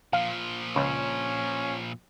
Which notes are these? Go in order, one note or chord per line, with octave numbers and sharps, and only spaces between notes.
A#2 F3 F5
C#2 C#4